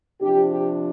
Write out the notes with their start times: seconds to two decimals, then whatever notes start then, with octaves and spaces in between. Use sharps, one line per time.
0.22 C3 F3 D4 G4
0.51 G4